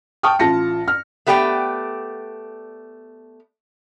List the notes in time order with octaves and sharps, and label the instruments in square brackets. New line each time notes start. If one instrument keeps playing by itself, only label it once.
[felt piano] G5 A5 C#6 D#6 F6
A1 F4 A5 A#6 C#7
F6
[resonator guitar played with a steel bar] A3 B3 G4 D5 G5